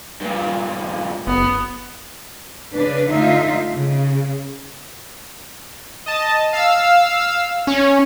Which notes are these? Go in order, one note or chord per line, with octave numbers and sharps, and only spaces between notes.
G2 A#2
F#1 B3
C#3 D4 B4
D3 A3 D#4 F4 E5
C#3
D#5 A5
F5 E6
C#4 C#5